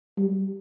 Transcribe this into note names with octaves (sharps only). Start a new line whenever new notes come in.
G3